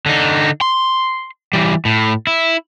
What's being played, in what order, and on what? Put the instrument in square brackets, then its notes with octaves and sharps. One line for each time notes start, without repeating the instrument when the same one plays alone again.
[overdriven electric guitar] D3 D#4
C6
E3 G3
A2
E4